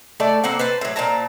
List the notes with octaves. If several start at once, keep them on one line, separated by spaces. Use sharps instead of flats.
A3 A4 D5 A5
A#3 C4 F#5
B4 C5 A5
A2 F#3
A#2 C4 A5 A#5